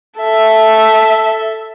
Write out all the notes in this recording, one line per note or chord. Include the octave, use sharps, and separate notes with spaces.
A4 E5